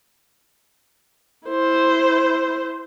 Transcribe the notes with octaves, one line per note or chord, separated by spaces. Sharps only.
E4 C5